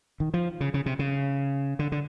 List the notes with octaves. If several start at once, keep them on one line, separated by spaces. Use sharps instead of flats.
D#3
F3
C#3
C#3
C3
C#3
D3
D3